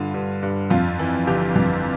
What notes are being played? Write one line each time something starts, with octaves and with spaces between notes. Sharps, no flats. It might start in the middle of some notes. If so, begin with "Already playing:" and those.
Already playing: G2 D3 F4
G2
G2
F2 F4
E3
G1 G4
F2